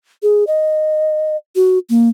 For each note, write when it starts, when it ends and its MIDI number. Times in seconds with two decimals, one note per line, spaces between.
0.23 0.44 68
0.47 1.36 75
1.56 1.78 66
1.90 2.09 58